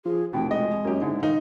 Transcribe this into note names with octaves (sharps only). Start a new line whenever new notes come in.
F3 G#4
F1 B2 E3 F3 G5
G#3 D#5
F#2 A#3 G4
G#2 D3 E4
D#3 D#4 D#5 F5